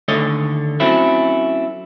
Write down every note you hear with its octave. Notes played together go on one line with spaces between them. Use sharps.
D#2 D3 A3 A4 C#5 D#5
F#3 A3 C4 C#4 E4